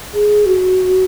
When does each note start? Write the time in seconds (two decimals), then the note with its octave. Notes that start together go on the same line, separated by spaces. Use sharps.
0.14 G#4
0.46 F#4